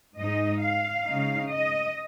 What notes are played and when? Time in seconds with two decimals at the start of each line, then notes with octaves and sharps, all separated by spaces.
0.18 G#2 G#3 D#4 D#5
0.63 F5
1.07 C#3 G#3 D#4
1.51 D#5